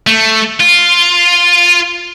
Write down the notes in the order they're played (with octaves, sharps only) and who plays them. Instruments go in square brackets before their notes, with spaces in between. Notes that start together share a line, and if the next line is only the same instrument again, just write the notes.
[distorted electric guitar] A3
F4